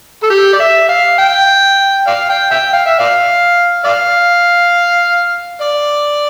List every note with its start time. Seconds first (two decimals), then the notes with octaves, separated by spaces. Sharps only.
0.23 A4
0.30 G4
0.53 D5
0.60 E5
0.89 F5
1.18 G5
2.07 D5 F5
2.29 G5
2.51 E5 G5
2.73 F5
2.86 E5
2.99 D5 F5
3.84 D5 F5
5.61 D5